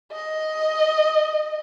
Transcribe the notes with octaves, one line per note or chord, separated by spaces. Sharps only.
D#5